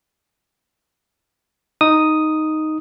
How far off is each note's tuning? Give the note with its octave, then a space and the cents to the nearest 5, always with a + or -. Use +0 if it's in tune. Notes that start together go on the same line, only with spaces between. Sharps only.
D#4 +0 D#6 +0